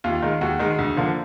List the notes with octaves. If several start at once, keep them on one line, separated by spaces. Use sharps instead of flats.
D#2 F4
D#3 G#3
D#2 F#4
D#3 G#3
D2
D3 F3 A#3